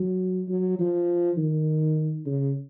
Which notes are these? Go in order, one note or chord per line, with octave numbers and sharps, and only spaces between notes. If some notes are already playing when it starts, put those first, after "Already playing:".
Already playing: F#3
F#3
F3
D#3
C#3